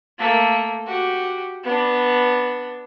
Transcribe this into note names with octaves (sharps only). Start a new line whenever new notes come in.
A3 A#3
F#4 G4
B3 D4